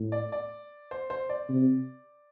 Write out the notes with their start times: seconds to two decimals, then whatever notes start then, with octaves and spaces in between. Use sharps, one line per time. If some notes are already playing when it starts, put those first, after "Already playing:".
Already playing: A2
0.12 D5
0.32 D5
0.91 C5
1.10 C5
1.29 D5
1.49 C3